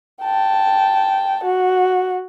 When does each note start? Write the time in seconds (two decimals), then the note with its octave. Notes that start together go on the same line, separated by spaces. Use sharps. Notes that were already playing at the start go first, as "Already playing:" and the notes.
0.23 G5 A5
1.44 F#4